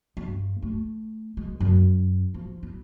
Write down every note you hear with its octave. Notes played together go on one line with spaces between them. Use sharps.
G2
A3
G#3
F#2
F3
E4